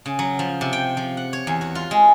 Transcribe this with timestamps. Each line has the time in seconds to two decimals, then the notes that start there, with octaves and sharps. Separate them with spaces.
0.06 C#3
0.19 F#3
0.39 F3
0.61 C3
0.73 G5
0.97 F3
1.17 F#5
1.33 C#5
1.47 E2
1.61 F#4
1.75 F4
1.91 G#3